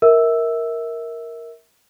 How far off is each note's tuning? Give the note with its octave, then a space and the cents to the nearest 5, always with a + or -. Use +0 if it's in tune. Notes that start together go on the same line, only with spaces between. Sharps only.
A#4 +0 E5 -30 E6 +0